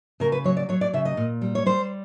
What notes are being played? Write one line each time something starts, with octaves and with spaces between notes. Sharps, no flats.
C#3 A#4
B4
F#3 C#5
D5
F#3 C#5
D5
C#3 E5
D#5
A#2
G3
C#5
G3 C5